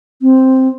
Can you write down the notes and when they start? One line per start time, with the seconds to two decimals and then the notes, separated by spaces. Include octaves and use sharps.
0.22 C4